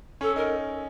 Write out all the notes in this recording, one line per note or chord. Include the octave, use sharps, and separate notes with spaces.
C#4 A4
D#4 A#4